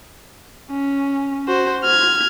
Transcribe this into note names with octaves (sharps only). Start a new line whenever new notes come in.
C#4
F#4 C5
F6 G#6